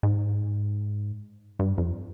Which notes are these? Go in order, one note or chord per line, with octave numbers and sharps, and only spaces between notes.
G#2
G2
F2